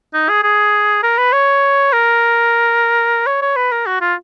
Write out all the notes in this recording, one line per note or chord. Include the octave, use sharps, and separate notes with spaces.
D#4
G#4
G#4
A#4
B4
C#5
A#4
C#5
C#5
B4
A#4
F#4
F4